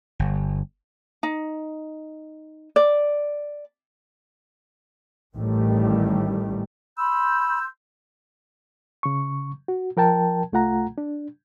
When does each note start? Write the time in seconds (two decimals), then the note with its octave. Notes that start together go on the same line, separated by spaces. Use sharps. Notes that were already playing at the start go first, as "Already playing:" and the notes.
0.19 G1
1.23 D#4
2.76 D5
5.36 A1 A2 D#3 G3 A3
6.98 B5 C6 E6 G6
9.03 C#3 C#6
9.68 F#4
9.97 F3 A#4 G5 A5
10.52 C2 A3 F4 F#5 A#5
10.98 D4